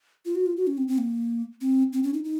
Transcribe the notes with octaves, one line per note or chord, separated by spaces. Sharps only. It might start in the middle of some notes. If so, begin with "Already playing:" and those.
F4
F#4
F4
F#4
C#4
C4
C4
A#3
C4
C4
C#4
D#4
D#4